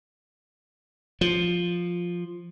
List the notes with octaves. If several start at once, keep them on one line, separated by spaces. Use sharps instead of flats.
F3